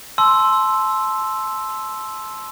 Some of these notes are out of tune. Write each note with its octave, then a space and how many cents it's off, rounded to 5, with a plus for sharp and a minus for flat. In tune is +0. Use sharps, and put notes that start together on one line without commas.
A5 -30 C6 +0 E6 +0